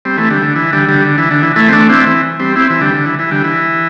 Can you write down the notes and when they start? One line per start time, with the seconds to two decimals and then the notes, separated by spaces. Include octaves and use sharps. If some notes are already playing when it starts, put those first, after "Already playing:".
0.05 G3 C4
0.17 E3 A3
0.30 D3 G3
0.42 D3
0.56 E3
0.73 D3 G3
0.89 D3 G3
1.05 D3
1.18 E3
1.31 D3
1.43 E3
1.56 E3 A3
1.68 C4
1.72 A3 D4
1.89 C4 E4
2.06 E3
2.39 G3 C4
2.56 C4 E4
2.70 E3
2.81 D3 G3
2.94 D3
3.06 E3
3.19 E3
3.31 D3 G3
3.44 E3